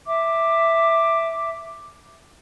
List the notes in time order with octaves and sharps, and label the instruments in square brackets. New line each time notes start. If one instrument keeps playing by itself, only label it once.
[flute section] E5 D6